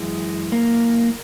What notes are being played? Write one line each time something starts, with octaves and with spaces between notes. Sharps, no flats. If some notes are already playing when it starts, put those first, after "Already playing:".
Already playing: F#2 E3 G#3 G#4
A#3 A#4